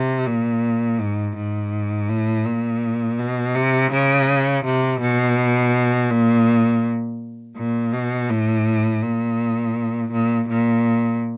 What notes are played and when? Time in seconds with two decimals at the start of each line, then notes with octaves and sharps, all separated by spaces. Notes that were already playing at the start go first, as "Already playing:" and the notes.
Already playing: C3
0.27 A#2
1.00 G#2
1.36 G#2
2.09 A2
2.46 A#2
3.19 B2
3.55 C3
3.92 C#3
4.65 C3
5.01 B2
6.11 A#2
7.57 A#2
7.93 B2
8.30 A2
9.03 A#2
10.12 A#2
10.49 A#2